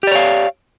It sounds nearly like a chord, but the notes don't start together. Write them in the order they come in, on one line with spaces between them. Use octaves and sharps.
G4 D5 C#5 F5